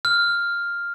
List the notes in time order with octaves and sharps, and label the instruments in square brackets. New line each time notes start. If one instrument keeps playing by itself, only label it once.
[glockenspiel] F6